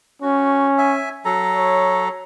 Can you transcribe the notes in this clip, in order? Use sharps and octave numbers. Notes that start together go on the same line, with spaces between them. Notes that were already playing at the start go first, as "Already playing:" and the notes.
C#4 F#4
E5 G#5
F#3 A4 A#5
C#5